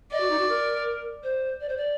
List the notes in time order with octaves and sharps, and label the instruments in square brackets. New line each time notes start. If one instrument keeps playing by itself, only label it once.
[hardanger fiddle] D5 [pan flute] D#5
[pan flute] F#4
D#4
F#4
A#4
C5
D5
C5
D5